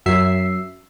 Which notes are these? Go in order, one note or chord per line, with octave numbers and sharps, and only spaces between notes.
F#2 F#3 E5 C7